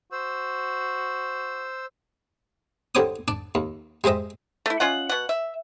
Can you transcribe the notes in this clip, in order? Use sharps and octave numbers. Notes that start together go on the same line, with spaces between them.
F#4 C5 E6
D3 G3 C5 C#5 D6 D#6
D4 D5
D#2
G3 G#3 C5 D#5 E5
A3 E4
C#4 F4 D#5 F#5
B2 F#5
E5